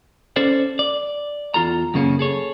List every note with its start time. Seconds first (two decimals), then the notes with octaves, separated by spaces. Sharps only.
0.36 C#4 A4 C5 D5
0.79 D5
1.54 E2 F4 A4 A#5
1.94 F#2 C#3 A#3 C#4
2.19 G#4 A4 C#5